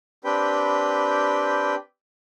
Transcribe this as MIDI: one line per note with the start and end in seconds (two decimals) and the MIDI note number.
0.24 1.75 60
0.24 1.75 62
0.24 1.75 67
0.24 1.75 71
0.24 1.75 79
0.24 1.75 83